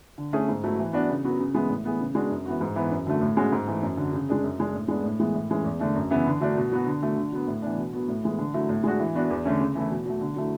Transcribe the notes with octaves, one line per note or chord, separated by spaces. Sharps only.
D3
A3 C#4 G#4
G#2
F#3 A3 E4
E3
B3 D4 F#4
C#3
F#3 B3 F#4
C#3
E3 G#3 B3
A2
E3 B3 E4 G#4
C#3
G#3 B3 D4 F#4
F#2
E3 B3 F#4
G#2
E3 B3
F#2
D3 F#3 A3
A2
G#3 C#4 F#4
G#2
E3 A3
F#2
D3 F#3
C#3
G#3 D4 G#4
F#2
C#3 G#3 D4
A2
G#3 B3 D4
A2
E3 G#3 B3
A2
E3 G#3 C#4
E2
D3 A3 D4
F#2
C#3 E3 B3 E4
D3
F#3 A3 D4
B2
F#3 B3 F#4
D3
F#3 A3
D3
F#3 B3
A2
E3 B3 D4
B2
F#3 B3 F#4
A2
E3 G#3 B3
D3
F#3 A3 E4
A2
G#3 D4 F#4
E3
B3 D4 F#4
E2
D3 A3 C#4
C#3
E3 A3 E4
B2
F#3 A3
D3
F#3 A3 E4